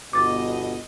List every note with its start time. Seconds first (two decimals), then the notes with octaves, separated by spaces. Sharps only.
0.13 G1 B2 D#5 D6 A6